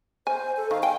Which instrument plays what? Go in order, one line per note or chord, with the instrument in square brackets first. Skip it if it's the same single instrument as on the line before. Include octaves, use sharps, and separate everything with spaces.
[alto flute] C5 [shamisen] G#5
[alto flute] A4
[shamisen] D#3 [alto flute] F5
[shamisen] G5 [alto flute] G#5